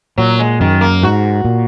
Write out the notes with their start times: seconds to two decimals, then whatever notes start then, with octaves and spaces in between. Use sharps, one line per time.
0.18 A#2 F#3
0.39 G#3
0.60 F#2 D#3
0.81 A#3
1.03 G#2 F#4
1.45 A#2